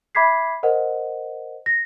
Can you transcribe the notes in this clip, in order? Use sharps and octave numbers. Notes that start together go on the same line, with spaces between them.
E5 B5 D6 G#6 B6 C7
A#4 C5 D#5 F#5
A#6